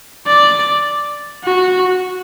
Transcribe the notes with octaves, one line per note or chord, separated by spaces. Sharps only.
D5
F#4